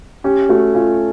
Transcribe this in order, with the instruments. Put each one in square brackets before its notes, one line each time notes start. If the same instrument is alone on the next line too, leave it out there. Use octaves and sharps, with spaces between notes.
[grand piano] C#4 [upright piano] G4
[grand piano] A3 [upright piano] F#4
[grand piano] C#4 [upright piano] F4